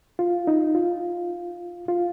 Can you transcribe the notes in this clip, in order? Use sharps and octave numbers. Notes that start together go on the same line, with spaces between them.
F4
D#4
F4
F4